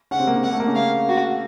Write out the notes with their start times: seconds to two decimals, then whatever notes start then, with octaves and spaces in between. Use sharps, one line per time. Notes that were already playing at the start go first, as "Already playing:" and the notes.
0.11 C#3 C#4 F#5
0.19 C3 C4
0.27 A#3
0.36 C3 C4
0.43 A#3 F#5
0.52 A3
0.60 A#3
0.68 C#3 C#4
0.75 A#3 F5
1.09 F#4